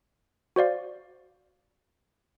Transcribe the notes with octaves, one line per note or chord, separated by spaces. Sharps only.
F#4 C5 D5 F5